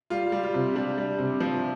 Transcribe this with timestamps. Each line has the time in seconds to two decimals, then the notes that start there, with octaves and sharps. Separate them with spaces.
0.10 G3 F4
0.32 G3
0.43 F4
0.54 C3
0.75 G3 D4
0.98 G3
1.18 C3
1.40 F3